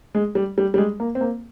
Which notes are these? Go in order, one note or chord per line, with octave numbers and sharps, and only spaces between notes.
G#3
G3
G3
G3
G#3
A#3
C4
A#3